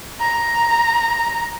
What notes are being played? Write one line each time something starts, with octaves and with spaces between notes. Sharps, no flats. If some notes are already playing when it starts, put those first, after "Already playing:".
A#5